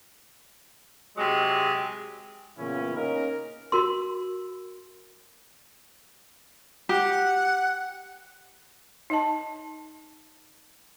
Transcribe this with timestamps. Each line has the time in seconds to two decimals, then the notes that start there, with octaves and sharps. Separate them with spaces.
1.17 C3 F#3 G#3
2.58 A#2 C#3 E3 B3 C#4 E4
2.95 A#3 C#4 D#4 A#4
3.72 F#4 A#4 C6
6.89 G4 F#5
9.10 D#4 D#5 A5